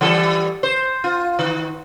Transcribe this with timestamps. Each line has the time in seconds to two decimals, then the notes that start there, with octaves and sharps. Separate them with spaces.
0.01 E3 G3 A4
0.63 C5
1.04 F4
1.39 D#3